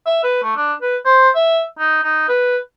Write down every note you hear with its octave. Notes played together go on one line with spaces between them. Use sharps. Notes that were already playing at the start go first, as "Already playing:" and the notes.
E5
B4
A3
D4
B4
C5
E5
D#4
D#4
B4